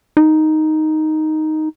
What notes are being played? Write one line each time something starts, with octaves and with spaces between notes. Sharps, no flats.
D#4